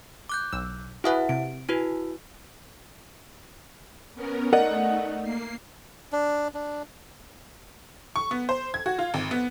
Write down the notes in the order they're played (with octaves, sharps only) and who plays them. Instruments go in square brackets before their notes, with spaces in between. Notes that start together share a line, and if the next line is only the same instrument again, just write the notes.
[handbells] D6 F#6 G6
[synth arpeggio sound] B1 E6
[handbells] E4 E5 F#5 [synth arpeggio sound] F#4 G#4 B4
[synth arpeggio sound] C3 [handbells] D7
[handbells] E4 F#4 B4 [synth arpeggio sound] G#5
[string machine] B3 C#4 A#4
[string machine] A3 D#4 [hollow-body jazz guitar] A#4 D5 D#5 [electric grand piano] F#5
[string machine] A#3 C7
[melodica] D4
D4
[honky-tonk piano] C#6
B3
C5
G#6
F#4
F4
G#1
B3